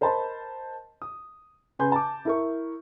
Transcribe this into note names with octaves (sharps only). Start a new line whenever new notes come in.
A#4 C5 D#5 A5 B5 C6
D#6
C#3 B4 G#5 C6 G6
A5 D6
E4 A#4 C#6